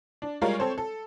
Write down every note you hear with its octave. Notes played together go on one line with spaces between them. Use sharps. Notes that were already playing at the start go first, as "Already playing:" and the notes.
D4
G3 G#3 F4 A#4 C#5
C4 A4 C5 C#5
A4